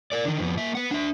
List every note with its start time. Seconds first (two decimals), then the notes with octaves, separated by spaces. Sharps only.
0.12 A#4 D5
0.25 D3 D#3
0.40 F2 B3
0.57 A#3 E5
0.75 B3 F#5
0.91 D4 E5